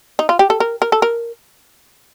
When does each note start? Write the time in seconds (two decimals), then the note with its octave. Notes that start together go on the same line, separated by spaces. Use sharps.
0.19 D#4
0.29 F4
0.39 G4
0.50 A4
0.60 A#4
0.82 A#4
0.92 A4
1.02 A#4